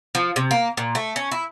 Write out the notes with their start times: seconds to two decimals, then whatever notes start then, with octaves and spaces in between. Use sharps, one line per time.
0.15 F3
0.36 C3
0.51 A#3
0.77 A#2
0.95 A3
1.16 C#4
1.31 E4